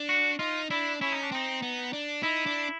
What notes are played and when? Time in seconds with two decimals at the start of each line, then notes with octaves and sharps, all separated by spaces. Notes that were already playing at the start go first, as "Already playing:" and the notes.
Already playing: D4
0.09 F#4
0.39 D#4 F4
0.70 D4 E4
1.01 C#4 E4
1.12 D#4
1.23 D4
1.32 C4 D#4
1.62 B3
1.93 D4
2.23 D#4 E4
2.46 D4